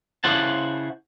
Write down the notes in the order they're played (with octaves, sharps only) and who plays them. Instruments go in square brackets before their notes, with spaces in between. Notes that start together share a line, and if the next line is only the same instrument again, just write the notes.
[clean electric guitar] C#3 E4 C5 F#5 A5